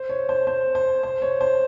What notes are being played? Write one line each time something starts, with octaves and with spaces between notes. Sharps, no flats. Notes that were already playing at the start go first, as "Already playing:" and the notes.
Already playing: C5
C#5
C5
C5
C5
C5
C#5
C5